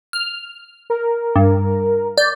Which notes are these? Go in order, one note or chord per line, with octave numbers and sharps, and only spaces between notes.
F6
A#4
G2
D5 G6